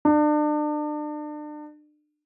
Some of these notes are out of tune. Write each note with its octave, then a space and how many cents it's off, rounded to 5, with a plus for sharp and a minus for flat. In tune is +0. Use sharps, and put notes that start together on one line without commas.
D4 +35